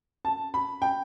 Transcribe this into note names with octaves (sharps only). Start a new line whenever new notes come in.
A5
B5
G5